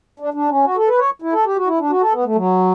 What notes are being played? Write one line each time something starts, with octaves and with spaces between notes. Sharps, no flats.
D4
D4
C#4
F#4
A4
B4
C#5
E4
A4
G4
F#4
E4
D4
F#4
A4
B3
A3
F#3